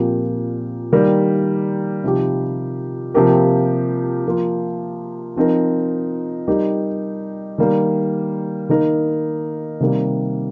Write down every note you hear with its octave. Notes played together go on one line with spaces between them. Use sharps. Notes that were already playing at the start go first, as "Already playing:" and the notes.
Already playing: A#2 F3 C4 G4 A#4
D#3 G3 A#3 G4 A#4
C3 F3 D#4 G4
C3 F3 A#3 G4 A#4
F3 A#3 F4
F3 C4 D#4 A#4
G3 D#4 G4 A#4
D#3 G3 A#3
D#3 A#3 D#4 A#4
C3 D#3 G3 A#3